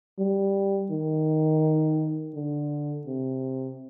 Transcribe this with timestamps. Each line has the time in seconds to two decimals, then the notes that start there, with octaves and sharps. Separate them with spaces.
0.19 G3
0.91 D#3
2.34 D3
3.07 C3